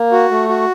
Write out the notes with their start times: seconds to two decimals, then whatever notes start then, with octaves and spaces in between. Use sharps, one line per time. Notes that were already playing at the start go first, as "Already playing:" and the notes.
Already playing: A#3
0.12 F#4
0.31 A3
0.49 F#4